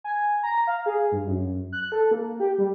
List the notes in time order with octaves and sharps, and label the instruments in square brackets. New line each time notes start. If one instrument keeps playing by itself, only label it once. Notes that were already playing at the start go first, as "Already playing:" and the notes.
[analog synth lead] G#5
A#5
F5
G#4
G2
F#2
F#6
A4
A#3
G4
G3